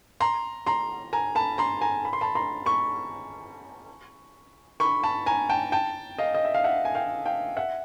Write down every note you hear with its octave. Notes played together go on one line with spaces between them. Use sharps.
A#5 C6
A#5 C6
G#5 A#5
A5 B5
A#5 C6
G#5 A#5
B5
C6
A5 B5
A#5 C6
B5 C#6
B5 C#6
A5 B5
G#5 A#5
G5 A5
G5 A5
D#5 F5
D#5
E5
F5
E5 F#5
G#5
F5 G5
F5 G5
E5 F#5